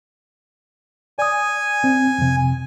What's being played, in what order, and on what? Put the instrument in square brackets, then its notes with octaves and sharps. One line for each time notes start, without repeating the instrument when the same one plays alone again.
[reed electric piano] D5 D#6 [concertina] G#5
[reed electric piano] C4
F2 C3